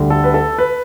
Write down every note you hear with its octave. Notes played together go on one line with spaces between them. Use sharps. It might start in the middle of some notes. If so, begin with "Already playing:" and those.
Already playing: D2 D3 G3
A4
B4
A4
B4